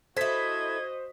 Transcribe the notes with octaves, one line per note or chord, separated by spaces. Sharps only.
E4 F#4 A4 C5 D#5 G#6 B6